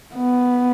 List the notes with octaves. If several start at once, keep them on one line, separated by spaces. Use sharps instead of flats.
B3